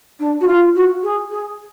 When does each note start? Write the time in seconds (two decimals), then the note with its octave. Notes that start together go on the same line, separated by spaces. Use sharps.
0.20 D4
0.41 F#4
0.47 F4
0.75 F#4
1.03 G#4
1.31 G#4